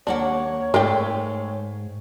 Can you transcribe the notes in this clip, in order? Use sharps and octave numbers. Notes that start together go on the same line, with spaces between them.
D#2 A#3 D4 C#5 F#5
G#2 G#3 A3 A#4 D5 G5